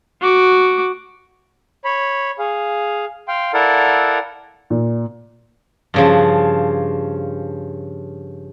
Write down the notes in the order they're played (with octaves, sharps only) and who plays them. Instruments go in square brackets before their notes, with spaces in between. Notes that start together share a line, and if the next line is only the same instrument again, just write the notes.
[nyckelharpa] F#4 D6
[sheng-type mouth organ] C#5 B5
G#4 F5
F5 G5 C6
E4 A4 A#4 D5 F5 F#5
[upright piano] A#2
[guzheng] G2 C#3 F3